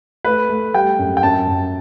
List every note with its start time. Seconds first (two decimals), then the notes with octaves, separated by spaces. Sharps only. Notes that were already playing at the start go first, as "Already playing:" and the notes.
0.24 A3 B4
0.49 A3
0.74 G3 G5
0.99 F#2
1.17 G5
1.23 F#2 A5
1.48 F#2